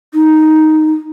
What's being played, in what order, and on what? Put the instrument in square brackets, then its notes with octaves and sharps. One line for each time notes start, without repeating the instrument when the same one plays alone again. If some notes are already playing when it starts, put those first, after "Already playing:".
[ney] D#4